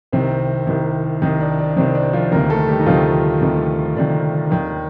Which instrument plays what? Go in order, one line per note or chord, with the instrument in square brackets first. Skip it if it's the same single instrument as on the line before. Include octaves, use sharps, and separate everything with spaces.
[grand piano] C2 C3 D#3 C4
C2 C3 D#3
C2 C3 D#3 D#4
D4
D4
C2 C3 D#3 C4
D4
F3 F4
D2 C3 D#3 A#3 A#4
A3 A4
G3 G4
D#4
D2 C3 D#3 F3 F4
D2 C3 D#3
D2 C3 D#3 D4
D#2 D#3